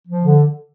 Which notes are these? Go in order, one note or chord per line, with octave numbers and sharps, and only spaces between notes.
F3
D3